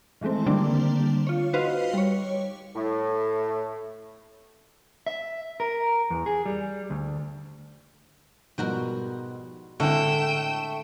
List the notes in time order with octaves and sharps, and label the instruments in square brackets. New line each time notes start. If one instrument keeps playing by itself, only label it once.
[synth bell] D#3 E3 G#3 A3 C4
D3 G3 A#3 C4 D4
F4 C#5
D#4 F#4 B4 C5 D#5 F5
G3 C#5
[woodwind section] A2
[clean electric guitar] E5
A#4
E2
G#4
G3
D2
[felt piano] G#2 B2 F3 [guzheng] G3 F#4 A#4
[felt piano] A2 C4 F#5 [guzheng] D3 G#3 [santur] A3 [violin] G5 E7